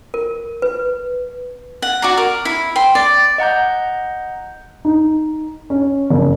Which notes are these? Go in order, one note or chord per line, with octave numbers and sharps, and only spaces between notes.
A#4
B4
F#5
F#4 D5 A#5
A#4
E4
G5 C6
D5
D#5 F#5 A#5 G6
D#4
C#4
F#1